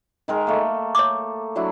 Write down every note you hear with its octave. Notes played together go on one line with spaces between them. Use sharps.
D#3 G#3 A#4
A3 A#3
C#5 D6
F#3 D4 E4